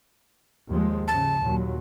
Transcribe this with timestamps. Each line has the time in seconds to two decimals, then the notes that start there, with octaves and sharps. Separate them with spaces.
0.68 D#2 F3 G#3
1.08 G#2 C#3 A5
1.41 D#2 A#2 F#3